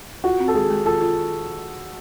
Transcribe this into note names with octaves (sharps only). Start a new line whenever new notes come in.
F4 F#4
C4
A4
G#3 G#4
G#3
F4 A4
F4